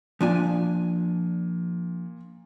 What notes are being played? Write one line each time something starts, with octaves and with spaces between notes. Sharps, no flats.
A#2 F3 D4 G#5